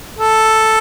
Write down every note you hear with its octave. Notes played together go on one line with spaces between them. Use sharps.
A4